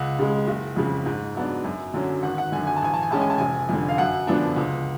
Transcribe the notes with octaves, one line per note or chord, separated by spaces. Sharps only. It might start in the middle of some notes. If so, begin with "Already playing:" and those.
Already playing: C#2 F#5
C#3 G#3
F#1
F2 C#3
G#2
F#3 B3 D4
F#2
D3 F#3 C#4
G#1 F#5
F#5
F#2 D3 G#5
G#5
A5
A1 G#5
A5
G#5
A2 G#3 C#4 A5
G#5
A5
F1 G#5
F2 D3
F5
F#2 F#5
D3 F3 B3 D4
C#2